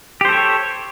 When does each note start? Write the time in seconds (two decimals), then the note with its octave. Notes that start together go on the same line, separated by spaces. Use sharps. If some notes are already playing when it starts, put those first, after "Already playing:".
0.21 G4
0.25 C5
0.29 A4
0.32 C#5